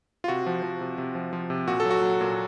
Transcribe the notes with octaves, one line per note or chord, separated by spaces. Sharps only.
F4
C3 F#4
F3
F3
C3
C3
F3
F3
C3
A#2 F#4
A4
F#3
F#4
F#3
A#2